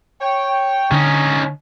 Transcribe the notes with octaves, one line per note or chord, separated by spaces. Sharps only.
C#5 G5
D3 C#4 D#4